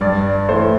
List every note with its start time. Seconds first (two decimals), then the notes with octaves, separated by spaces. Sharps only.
0.01 G2 D5
0.49 E3 A3 C5